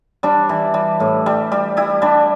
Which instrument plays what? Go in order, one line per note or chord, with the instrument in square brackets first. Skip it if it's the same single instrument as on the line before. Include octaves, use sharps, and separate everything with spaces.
[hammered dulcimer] G3 D4
E3
G3
A2
G3
G3
G3 E4
G3 D4